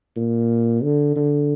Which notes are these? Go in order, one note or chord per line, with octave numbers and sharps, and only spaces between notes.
A#2
D3
D3